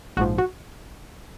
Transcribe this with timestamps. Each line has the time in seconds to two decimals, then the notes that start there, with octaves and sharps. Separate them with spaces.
0.17 A#1 G#2 F3 F#4
0.38 F#4